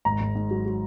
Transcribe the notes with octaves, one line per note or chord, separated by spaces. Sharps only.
G#1 A#5
G#1
G#2
F#3
F#3